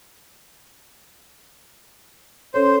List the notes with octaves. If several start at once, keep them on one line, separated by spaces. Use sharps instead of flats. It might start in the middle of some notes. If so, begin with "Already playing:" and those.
C#4 A4 C5 C#5